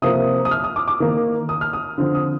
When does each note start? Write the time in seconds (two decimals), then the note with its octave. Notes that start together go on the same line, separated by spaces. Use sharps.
0.02 C3 F3 A#3 D#6
0.45 D#6
0.51 F6
0.64 D#6
0.76 D6
0.88 D6
1.00 D#3 A#3
1.49 D#6
1.61 F6
1.73 D#6
1.98 D3 F3 C4
2.15 D#6